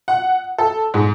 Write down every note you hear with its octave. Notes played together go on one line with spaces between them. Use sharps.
F#5
A4
G#2